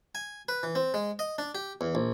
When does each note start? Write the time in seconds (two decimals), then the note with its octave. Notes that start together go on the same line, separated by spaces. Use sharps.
0.15 G#5
0.49 B4
0.63 E3
0.75 C4
0.94 G#3
1.19 D#5
1.38 D4
1.55 G4
1.81 E2
1.95 A#1